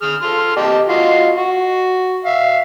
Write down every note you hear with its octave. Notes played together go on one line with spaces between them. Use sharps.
G#4 D#6 F6
A4 C6 F6
G4 D#5 A5
F4 F#4 D#5
F#4
E5 F5